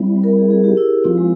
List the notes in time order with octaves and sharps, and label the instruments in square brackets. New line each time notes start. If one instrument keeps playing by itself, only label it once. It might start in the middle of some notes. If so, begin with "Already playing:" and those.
Already playing: [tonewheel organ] G3 C4 E4
[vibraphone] A#4
G#4
G#4
G4
E4
[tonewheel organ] F3 C4 F4 [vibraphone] E4
[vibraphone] G#3